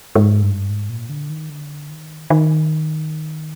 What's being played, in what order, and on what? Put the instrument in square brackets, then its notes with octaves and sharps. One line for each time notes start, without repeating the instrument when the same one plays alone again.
[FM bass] G#2
G2
G#2
A#2
D3
D#3
D3
D#3
D#3